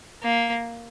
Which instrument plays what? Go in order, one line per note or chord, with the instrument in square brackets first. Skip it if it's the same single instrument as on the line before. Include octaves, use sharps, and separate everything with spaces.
[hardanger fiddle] A#3